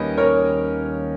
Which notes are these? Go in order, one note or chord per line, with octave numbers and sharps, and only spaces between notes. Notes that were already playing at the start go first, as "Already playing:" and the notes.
Already playing: D#2 D#3 G3 A#3 C#4 B4 D#5
A#4 C#5